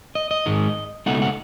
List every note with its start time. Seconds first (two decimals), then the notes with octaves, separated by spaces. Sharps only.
0.15 D#5
0.31 D#5
0.46 G#2 D#3 G#3
1.06 C#2 B2 A3 D#4 F#5
1.22 F#5